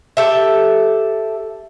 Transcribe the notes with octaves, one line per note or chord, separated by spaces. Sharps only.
G4 A4 E5